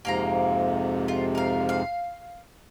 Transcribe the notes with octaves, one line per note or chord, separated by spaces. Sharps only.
F2 G#2 C3 A#3 F5 A#5
F4
A#4 F5
F5